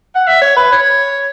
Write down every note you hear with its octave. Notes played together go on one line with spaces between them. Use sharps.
F#5
E5
C#5
B4
C#5